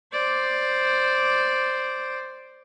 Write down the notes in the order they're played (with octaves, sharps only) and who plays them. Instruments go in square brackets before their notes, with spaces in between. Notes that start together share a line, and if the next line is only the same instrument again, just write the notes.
[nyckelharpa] C5 D5